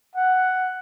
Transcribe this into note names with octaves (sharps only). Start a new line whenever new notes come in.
F#5